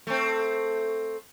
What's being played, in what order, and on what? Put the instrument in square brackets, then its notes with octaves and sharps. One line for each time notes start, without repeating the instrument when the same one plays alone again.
[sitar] A3 C4